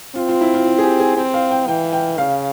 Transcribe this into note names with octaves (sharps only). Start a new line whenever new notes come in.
C4 F4
F4
E4
F4
F4
G#4
G4
G#4
C4 G5
F5
G5
E3 G5
G5
C#3 F5